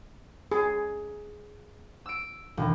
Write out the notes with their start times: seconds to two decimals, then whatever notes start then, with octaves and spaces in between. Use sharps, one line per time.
0.52 G#4
2.06 E6 D7
2.57 E1 D#3